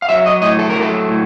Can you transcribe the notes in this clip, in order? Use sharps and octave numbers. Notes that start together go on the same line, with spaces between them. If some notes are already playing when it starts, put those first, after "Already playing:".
F5
F#3 E5
D#5
A2 D#5
A4
A#4
F#3
A4
A2